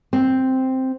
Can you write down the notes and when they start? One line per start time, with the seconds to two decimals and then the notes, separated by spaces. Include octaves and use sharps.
0.13 C4